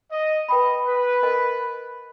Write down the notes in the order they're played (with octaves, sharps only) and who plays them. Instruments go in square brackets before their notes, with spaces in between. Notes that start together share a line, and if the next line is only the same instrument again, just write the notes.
[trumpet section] D#5
[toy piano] B4 G5 B5 [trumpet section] D#5
[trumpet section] B4
[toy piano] A#4 D#5 G#5 B5